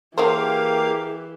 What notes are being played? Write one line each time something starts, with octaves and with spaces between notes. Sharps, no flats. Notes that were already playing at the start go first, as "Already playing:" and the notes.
E3 F#3 A#3 G4 G#4 A#4 C5 F5